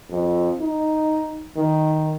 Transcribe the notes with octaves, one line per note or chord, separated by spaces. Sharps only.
F2
D#4
D#3